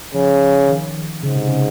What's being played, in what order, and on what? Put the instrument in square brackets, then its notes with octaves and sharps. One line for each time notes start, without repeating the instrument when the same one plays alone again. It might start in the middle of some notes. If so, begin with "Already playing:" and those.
[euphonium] C#3 [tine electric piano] F3
[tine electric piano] D#3
[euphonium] G#2 [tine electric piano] C#3
[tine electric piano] C3
C#3